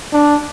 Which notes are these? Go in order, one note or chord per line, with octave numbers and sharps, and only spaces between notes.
D4